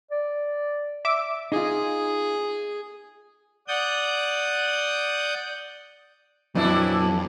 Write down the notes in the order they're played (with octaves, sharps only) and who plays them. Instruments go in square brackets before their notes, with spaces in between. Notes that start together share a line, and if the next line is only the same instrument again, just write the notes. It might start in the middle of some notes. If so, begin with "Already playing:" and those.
[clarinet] D5
[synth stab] E5 D6
[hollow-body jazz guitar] D#4 F4 [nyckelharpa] G#4
[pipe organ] D5 F#5 D#6 G6
[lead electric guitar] F2 [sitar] A#2 D4 E4 [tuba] F#3